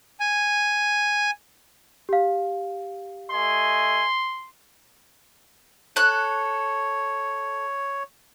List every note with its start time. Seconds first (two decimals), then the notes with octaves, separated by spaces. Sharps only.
0.20 G#5
2.09 G4 F5
3.30 A3 D#5 G#5 C6
5.96 A4 C#5 F#6